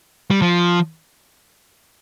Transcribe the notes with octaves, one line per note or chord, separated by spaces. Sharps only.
G3
F3